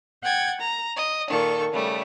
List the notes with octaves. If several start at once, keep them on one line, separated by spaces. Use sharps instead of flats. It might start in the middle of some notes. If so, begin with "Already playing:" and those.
F#5 G5 G#6 A6
A#5
D#5
A#2 D#3 A4 C#6
C#3 G3 A3